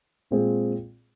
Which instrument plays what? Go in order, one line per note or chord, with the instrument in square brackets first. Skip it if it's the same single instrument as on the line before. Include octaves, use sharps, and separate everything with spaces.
[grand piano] A#2 G#3 C4 F4 G#4